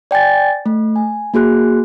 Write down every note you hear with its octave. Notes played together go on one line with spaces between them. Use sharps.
D5 G5 G#5 A6
A3
G#5
A#3 F#4 G#4 F#6